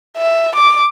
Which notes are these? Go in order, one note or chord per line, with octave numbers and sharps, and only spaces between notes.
E5
D6